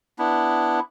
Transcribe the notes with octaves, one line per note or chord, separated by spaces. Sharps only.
B3 D4 E4